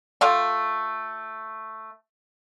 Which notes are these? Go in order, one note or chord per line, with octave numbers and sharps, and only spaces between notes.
A3 F4 G4